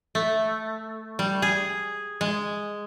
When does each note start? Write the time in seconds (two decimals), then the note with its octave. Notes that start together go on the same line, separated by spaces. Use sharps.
0.15 A3
1.19 G3
1.42 G#4
2.21 G#3